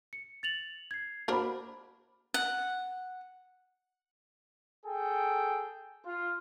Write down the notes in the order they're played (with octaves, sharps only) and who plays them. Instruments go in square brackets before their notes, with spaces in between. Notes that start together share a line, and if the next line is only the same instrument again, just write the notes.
[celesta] C#7
A6 F7 F#7
G#6 C7
[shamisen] A#3 D4 A#4 [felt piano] F#4 C5 B5
[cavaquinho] F#5
[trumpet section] G#4 A4 G5
F4